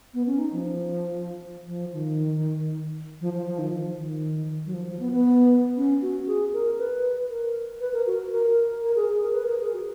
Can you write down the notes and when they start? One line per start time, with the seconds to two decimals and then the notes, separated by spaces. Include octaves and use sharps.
0.14 B3
0.27 C#4
0.39 D#4
0.52 F3
1.67 F3
1.93 D#3
3.21 F3
3.34 F3
3.47 F3
3.59 D#3
3.72 F3
3.97 D#3
4.66 F#3
4.74 F3
4.87 F3
5.00 B3
5.12 B3
5.77 C#4
6.02 F#4
6.27 G#4
6.53 A#4
6.78 B4
7.30 A#4
7.81 B4
7.93 A#4
8.07 F#4
8.32 A#4
8.83 A#4
8.96 G#4
9.09 G#4
9.22 A#4
9.34 B4
9.47 A#4
9.60 G#4
9.73 F#4